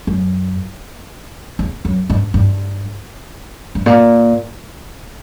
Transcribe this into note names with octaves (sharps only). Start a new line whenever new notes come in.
F#2
E2
F#2
G2
G2
G2
A#2